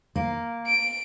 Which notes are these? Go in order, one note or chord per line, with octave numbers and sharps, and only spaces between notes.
A#3
D7